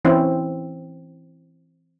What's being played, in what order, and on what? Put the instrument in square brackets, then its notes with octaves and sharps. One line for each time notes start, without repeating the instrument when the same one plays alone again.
[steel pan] E3 C4 C#4 E4